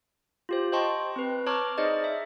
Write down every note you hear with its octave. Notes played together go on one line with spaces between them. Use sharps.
F4 G4 C5
C5 D#5 G5 A5 C6 C#6
C4 B4
C#5 A5 A#5 C#6 D6 F6
D#4 G#4 C5 D5 D#5
E5